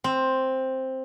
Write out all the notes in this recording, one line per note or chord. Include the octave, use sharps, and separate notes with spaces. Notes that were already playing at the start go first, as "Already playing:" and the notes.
C4